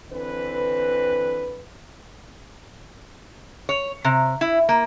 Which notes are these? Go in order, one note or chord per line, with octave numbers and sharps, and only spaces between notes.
D3 E3 C4 B4
C#5
C3
E4
A#3